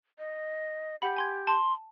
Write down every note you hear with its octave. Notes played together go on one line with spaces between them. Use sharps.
D#5
G4 F#5 B5
G#5 C6 G#6
A5 C6